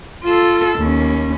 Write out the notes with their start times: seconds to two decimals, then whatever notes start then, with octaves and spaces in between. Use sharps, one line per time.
0.24 F4 A4
0.79 D#2 C#4